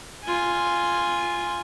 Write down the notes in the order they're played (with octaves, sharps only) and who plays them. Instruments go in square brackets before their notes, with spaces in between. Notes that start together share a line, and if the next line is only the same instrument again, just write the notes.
[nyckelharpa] F4 G#5